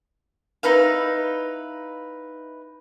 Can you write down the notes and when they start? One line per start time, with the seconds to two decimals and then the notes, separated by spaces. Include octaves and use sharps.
0.63 D#4 E4 B4 F5